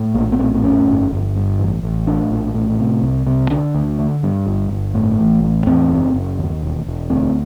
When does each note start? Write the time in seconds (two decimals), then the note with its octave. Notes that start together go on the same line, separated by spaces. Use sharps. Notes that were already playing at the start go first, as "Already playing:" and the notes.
Already playing: A2
0.14 A#1 A#3
0.32 B3
0.39 A2 C4
0.54 C4
0.63 F2 C#4
0.87 G1
1.11 G1
1.36 G2
1.59 A1
1.83 A1
2.07 A2 D4
2.31 A#1
2.54 A2
2.78 C3
3.02 C2
3.27 C3
3.50 D3 D4
3.75 D2
3.99 D3
4.23 G2
4.46 G1
4.71 G1
4.94 A2
5.19 A1
5.43 A2
5.66 E2 C4
5.91 F#1
6.14 F#1
6.39 D#2
6.62 E1
6.87 E1
7.10 D2 C4